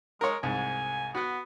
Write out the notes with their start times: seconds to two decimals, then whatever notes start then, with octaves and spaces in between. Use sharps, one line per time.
0.21 G#3 A#4 C#5
0.43 C2 G#2 G#5
1.15 B3 F#4 F#5